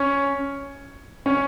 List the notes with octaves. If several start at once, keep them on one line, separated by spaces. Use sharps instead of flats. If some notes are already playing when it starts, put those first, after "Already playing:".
Already playing: C#4 C#5
C#4 C#5